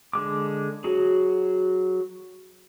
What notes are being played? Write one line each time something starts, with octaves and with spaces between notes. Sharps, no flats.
D3 G#3 D6
F#3 F#4 G#4